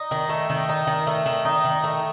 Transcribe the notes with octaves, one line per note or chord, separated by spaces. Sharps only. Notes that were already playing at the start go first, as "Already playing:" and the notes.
Already playing: D#4
D#3
A3
D#3
D#4
D#3
A3
D#3
D#4
D#3
A3